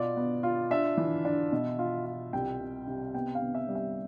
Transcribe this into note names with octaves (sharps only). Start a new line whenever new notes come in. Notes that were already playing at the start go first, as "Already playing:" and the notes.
Already playing: B2 F4 D5
B3
F4
D4 E5
E3
D4
B2
F4
F4
C2 G5
C3
C3
B3 G5
F5
B3
E5
G3
E5